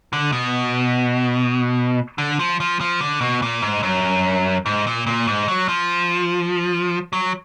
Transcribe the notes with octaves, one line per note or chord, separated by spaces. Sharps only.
D3
B2
D3
F3
F3
F3
D3
B2
A#2
G#2
F#2
G#2
A#2
A#2
G#2
F#3
F3
F#3